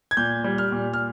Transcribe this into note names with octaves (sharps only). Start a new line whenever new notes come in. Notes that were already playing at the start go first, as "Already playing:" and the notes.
G#6
A#2 G6
G3
F6
A#2
F6